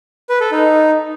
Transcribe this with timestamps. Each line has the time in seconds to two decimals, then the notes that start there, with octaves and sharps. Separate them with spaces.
0.29 B4
0.40 A4
0.51 D#4